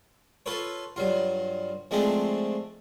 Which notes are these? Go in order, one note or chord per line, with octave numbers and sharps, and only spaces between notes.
F4 A4 B4 C#5
G2 F#3 F4
F3 G#3 A3 C4 D4